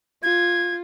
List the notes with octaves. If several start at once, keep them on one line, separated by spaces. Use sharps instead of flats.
F4 G#6